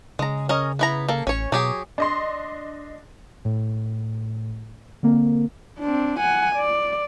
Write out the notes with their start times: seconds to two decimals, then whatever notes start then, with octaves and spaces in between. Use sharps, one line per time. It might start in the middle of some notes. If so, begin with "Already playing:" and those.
0.19 C#3 G#3 A#5
0.49 C#4 A#4 D#5
0.79 B3 E4 A#5
1.08 A#3 A4
1.27 A1 C#4 C#5
1.52 B2 F#3 G4 G#4
1.98 D4 D#5 C6
3.45 A2
5.03 D3 A#3 C4 A#4
5.80 C4 D4
6.20 F#5 G#5
6.56 D5